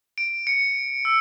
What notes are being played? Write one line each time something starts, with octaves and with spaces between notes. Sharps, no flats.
D7
C#7
E6